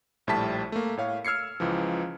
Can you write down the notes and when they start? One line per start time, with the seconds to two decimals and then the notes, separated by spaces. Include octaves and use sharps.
0.27 A#1 A2 G3 E4 A5 B6
0.72 A3 A#3
0.97 A2 C#5 F5
1.25 E6 F6 G#6 C7 C#7
1.60 C#2 E3 F3